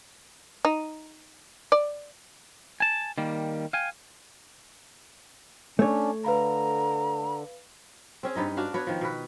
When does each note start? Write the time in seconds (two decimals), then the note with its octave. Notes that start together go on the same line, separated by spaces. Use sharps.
0.65 D#4
1.72 D5
2.80 G#5 A5
3.18 D#3 G3 A#3
3.73 F5 G5 G#5
5.79 A3 C#4 D4 C#5
6.24 D3 B4 F5 A#5 B5
8.23 C4 C#4 G#4
8.35 G2 B3 D#4 D#5
8.57 D4 F#4 F5
8.74 B3 F#4 C#5
8.87 D#3 F3
9.01 B2 B4